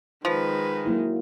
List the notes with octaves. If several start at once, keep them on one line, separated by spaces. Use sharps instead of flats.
D#3 F3 G#3 B4
F#3 A#3 E4